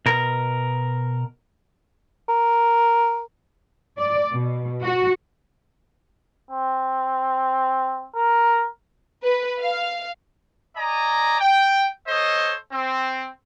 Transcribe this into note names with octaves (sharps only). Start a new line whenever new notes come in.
B2 A#4
A#4
D5
B2
F#4
C4
A#4
B4
F5
D5 D#5 G#5 A#5
G5
A4 C5 C#5 D#5
C4